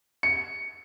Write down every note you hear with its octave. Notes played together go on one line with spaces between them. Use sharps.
C#7